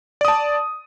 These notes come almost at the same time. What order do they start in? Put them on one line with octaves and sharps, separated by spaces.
D5 D#6 A5